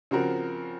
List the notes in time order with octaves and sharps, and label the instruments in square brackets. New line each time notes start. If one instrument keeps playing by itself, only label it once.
[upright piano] C#3 F3 C4 F#4 A#4